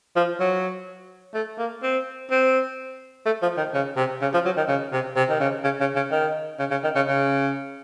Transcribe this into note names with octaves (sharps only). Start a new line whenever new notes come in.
F3
F#3
A3
A#3
C4
C4
A3
F3
D#3
C#3
C3
C#3
F3
F#3
D#3
C#3
C3
C3
D#3
C#3
C#3
C#3
C#3
D#3
C#3
C#3
D#3
C#3
C#3